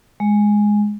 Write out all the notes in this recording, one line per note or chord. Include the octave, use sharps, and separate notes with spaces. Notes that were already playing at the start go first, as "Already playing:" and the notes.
G#3